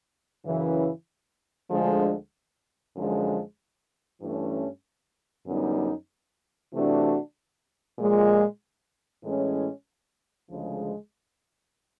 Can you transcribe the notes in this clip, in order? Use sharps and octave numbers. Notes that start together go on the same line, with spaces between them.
F#2 C#3 E3
D2 D3 F3 G#3
F#2 D3 F3 G#3
G2 E3 A3 C#4
F#2 D3 G3 B3 D#4
C3 E3 A3 D4 F#4
A#2 F3 G#3
A2 E3 G#3 C#4
D2 C#3 F3 G#3